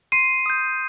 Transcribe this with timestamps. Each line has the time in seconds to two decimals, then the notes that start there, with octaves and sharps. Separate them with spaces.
0.12 C6 C7 D#7
0.46 D#6 G6